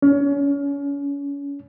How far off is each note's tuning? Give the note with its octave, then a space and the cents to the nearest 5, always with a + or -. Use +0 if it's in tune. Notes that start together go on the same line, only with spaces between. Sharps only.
C#4 +30